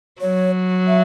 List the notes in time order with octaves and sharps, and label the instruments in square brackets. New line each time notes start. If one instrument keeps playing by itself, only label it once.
[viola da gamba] F#3 [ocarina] C#5
[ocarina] E5